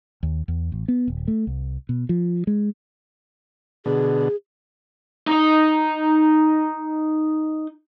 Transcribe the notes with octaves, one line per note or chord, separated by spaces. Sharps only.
D#2
E2
A1
B3
D#1
A3
C2
B2
F3
G#3
B2 D3 G#4
D#4 D#5